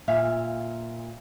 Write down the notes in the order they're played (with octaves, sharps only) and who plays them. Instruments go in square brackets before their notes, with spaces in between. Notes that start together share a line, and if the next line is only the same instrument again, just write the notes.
[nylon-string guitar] A#2 E5 F5 G#5